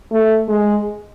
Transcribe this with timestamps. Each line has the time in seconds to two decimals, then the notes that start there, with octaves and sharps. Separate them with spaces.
0.11 A3
0.48 G#3